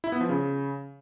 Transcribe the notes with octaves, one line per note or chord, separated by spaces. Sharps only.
E4
B3
F3
C#3